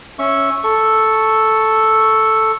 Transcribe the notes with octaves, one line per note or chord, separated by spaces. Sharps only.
C#4 E5 C#6
A4 C#6